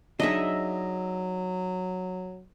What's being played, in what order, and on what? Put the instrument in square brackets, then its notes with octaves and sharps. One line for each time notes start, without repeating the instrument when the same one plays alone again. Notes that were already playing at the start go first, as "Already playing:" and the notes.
[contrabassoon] F#3 [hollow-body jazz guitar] D4 D#4 G#4 [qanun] D#5 E5